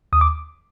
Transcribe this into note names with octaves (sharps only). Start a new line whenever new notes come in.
D#2 D#6
D6